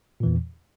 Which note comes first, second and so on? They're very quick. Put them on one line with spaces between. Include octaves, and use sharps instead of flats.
A#2 E3 E2